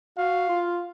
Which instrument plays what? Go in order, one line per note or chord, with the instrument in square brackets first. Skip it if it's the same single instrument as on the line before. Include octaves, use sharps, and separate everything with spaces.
[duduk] F#4 [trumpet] F5
[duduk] F4